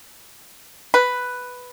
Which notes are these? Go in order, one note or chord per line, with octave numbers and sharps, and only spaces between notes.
B4